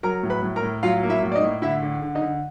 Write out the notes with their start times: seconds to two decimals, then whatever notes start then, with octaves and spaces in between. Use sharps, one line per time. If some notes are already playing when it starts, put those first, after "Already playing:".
0.03 F#3 A#4 A#5
0.23 A2
0.30 B4 B5
0.43 A2
0.56 A#4 A#5
0.63 A2
0.83 F#3 F4 F5
1.03 A#3
1.09 E4 E5
1.23 A2
1.32 D5
1.36 D#4 D#5
1.43 A2
1.62 D3 E4 E5
1.82 D3
2.02 D3
2.15 D#4 D#5
2.21 D3